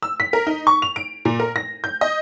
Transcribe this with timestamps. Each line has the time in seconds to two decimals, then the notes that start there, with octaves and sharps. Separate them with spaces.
0.03 E6
0.20 B6
0.33 A#4
0.47 D#4
0.67 C#6
0.82 F7
0.96 D7
1.25 A#2
1.40 A#4
1.56 A#6
1.84 G6
2.01 D#5